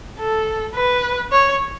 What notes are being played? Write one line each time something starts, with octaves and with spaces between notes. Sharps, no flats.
A4
B4
C#5